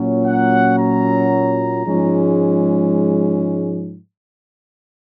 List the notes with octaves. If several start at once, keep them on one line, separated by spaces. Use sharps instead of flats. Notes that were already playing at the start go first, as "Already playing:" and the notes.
Already playing: A#2 F#3 C#4
F#5
A#5
G#2 F3 G#3 C#4